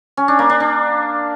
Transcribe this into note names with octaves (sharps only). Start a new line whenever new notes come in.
C#4
D4
A#3
D4
D4